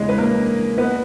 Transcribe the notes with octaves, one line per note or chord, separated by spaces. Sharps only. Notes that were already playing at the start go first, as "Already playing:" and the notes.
Already playing: E2 C#3 E3 G#3 G#4
B4
A#3 A#4
A#2 B3 B4